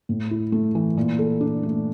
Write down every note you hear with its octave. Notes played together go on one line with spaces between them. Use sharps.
A2
E4
A3
E3
A#2
A4
D4
A3